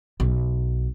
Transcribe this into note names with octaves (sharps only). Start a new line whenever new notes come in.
B1